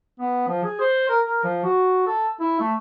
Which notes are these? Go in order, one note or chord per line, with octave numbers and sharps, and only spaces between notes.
B3
F3
G#4
C5
A#4
A#4
F3
F#4
A4
E4
A3